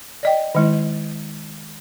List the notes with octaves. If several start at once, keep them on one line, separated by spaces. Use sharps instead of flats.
D5 D#5 G5
D#3 G#3 E4